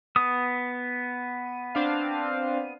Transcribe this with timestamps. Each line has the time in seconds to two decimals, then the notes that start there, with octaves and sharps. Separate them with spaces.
0.16 B3 D#6
1.75 C4 D4 F5